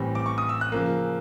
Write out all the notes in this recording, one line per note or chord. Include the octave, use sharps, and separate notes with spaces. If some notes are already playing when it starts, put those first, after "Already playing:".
Already playing: A2 E3 G3 C4
D6
C#6
D#6
E6
F#6
C#3 F3 A#3